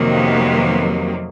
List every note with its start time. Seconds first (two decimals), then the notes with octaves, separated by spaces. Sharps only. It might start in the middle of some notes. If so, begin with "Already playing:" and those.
Already playing: F2 C3 D#3 F#3 A#3
0.14 B3